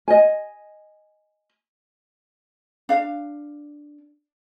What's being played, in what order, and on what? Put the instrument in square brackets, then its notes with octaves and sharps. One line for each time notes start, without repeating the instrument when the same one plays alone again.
[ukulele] D#5 G#5
D4 F5